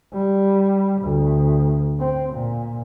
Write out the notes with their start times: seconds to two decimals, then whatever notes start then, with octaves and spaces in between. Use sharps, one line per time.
0.13 G3
1.02 D2
1.99 C4
2.34 A#2